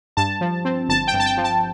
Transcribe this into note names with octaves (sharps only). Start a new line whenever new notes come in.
G2 A5
F3
C4
G1 A5
G5
G2
A5
G5
F3
A5